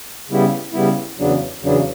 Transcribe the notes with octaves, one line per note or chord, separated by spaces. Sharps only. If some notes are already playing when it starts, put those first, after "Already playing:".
C#3 G3 B3 E4
C#3 G3 B3 E4
E2 C#3 F#3 B3 D4
E2 C#3 F#3 B3 D4